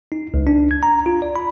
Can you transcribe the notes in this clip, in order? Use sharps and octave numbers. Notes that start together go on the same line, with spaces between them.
D#4
C#2
D4
G#6
A#5
F4
D5
B5